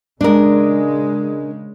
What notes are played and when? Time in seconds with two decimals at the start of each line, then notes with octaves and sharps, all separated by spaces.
0.21 C#3 G#3 D4 A#4